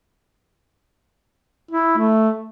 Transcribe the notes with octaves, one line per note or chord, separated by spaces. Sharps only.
E4
A3